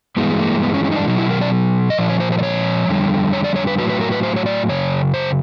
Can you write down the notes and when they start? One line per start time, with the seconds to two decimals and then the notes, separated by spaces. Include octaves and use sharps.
0.17 G2 E3 G#3 B3
0.40 A#3
0.62 B3
0.74 C#4
0.84 C#4
0.91 D#4
0.96 D4
1.07 B2 F#3 D#4
1.18 E4
1.30 A#4
1.41 D5
1.90 D#5
1.98 A#2 F3 D5
2.09 C#5
2.20 C5
2.32 C5
2.39 D5
2.43 C#5
2.88 F2 D3 G3
3.33 C#5
3.44 D5
3.56 C#5
3.67 B4
3.78 A2 F#3 B4
3.90 B4
4.01 A#4
4.12 B4
4.23 C5
4.36 C#5
4.46 D5
4.69 F#2 C#3 C#5
5.14 C5